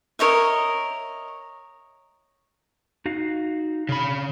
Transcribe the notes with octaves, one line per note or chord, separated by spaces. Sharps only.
A#4 C#5 D#5 E5
D#4 F#4 F5
C#3 B5